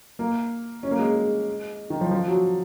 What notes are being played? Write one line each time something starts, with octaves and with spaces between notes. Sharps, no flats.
A#3
C#4
A#3
G#3
G#3
D#3
F3
F3
F#3